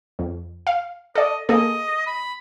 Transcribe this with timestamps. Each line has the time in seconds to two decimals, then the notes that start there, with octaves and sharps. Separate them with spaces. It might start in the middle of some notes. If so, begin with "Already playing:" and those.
0.19 F2
0.67 F5
1.15 A4 D5 D#5
1.49 A#3 G#4 A4 D#5
2.07 B5